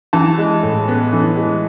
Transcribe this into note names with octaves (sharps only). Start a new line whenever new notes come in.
E3 A5
G#3
A2
B3
E3
G#3